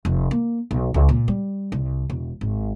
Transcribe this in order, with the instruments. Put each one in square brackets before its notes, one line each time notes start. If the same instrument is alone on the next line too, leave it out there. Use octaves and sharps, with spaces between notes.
[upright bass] F1
A#3
B1
C#2
A#2
G3
C2
E1
G#1